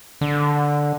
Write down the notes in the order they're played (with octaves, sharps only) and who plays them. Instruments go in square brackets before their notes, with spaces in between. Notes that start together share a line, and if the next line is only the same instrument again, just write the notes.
[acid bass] D3